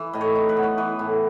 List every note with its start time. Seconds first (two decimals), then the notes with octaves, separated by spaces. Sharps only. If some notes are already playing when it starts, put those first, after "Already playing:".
Already playing: E3
0.13 A2 D#5
0.21 C#5
0.35 D#4
0.49 B4
0.57 B3
0.63 C#5
0.78 E3 B4
0.99 A2